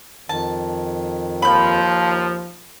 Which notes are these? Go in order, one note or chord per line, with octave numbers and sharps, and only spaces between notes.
F2 D#3 A5
D#2 F3 B5 G6